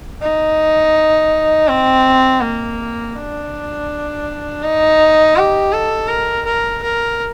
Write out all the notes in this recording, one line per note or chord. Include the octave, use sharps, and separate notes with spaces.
D#4
C4
A#3
D4
D#4
G4
A4
A#4
A#4
A#4